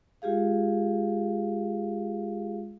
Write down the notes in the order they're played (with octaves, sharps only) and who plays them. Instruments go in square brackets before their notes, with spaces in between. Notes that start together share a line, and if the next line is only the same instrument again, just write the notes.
[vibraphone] G#3 F4 G4 G#4 F5